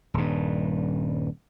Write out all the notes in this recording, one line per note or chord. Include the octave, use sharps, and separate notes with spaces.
D#1 G2